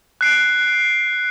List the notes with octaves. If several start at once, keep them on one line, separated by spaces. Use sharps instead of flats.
F#6 C7 D7